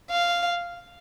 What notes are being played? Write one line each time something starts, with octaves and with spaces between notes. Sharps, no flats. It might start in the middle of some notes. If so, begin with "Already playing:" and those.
F5